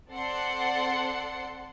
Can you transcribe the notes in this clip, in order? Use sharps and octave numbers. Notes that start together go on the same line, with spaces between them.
C4 A4 D5 F#5 C6 C#7